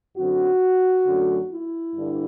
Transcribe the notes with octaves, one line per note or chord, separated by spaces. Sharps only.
F#2 D3 F#3 C4 F#4
F#2 D3 F#3 A3
E4
G2 D3